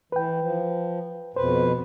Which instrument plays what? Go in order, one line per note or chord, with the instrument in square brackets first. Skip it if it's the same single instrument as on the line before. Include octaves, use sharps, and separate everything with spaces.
[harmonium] E3 [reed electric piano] B4 G5
[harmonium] F3
[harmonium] F2 B2 B4 [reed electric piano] C5